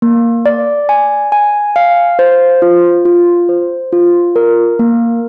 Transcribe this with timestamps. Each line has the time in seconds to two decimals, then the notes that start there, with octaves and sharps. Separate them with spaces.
0.02 A#3
0.46 D5
0.89 G#5
1.32 G#5
1.76 F5
2.19 C5
2.62 F4
3.05 F4
3.49 C5
3.92 F4
4.36 A#4
4.79 A#3